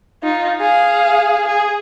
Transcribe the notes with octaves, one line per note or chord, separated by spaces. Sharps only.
D#4 F4
G#4 F5
G#4